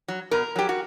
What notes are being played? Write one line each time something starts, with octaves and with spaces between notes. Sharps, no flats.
F#3
B2 A#4
F#3 G4
F#4